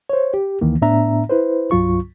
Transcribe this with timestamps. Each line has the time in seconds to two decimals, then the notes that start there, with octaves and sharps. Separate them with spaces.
0.10 C5 C#5
0.34 G4
0.61 D2 D#3 E3 A#3
0.82 A2 B3 D4 E5 A#5
1.29 E4 B4 C5
1.71 C2 G2 F#3 F4 C#6